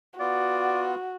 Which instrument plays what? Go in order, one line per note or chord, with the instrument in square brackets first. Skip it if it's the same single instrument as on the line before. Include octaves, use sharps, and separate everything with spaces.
[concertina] B3 F4 [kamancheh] F#4 [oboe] D5